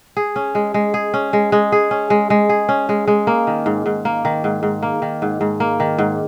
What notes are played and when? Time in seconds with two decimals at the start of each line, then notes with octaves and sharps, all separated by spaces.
0.17 G#4
0.36 C#4
0.55 G#3
0.74 G#3
0.94 G#4
1.14 C#4
1.33 G#3
1.52 G#3
1.72 G#4
1.91 C#4
2.10 G#3
2.30 G#3
2.49 G#4
2.69 C#4
2.89 G#3
3.08 G#3
3.27 A#3
3.47 D#3
3.66 G#2
3.86 G#2
4.05 A#3
4.25 D#3
4.44 G#2
4.63 G#2
4.83 A#3
5.02 D#3
5.22 G#2
5.41 G#2
5.60 A#3
5.80 D#3
5.98 G#2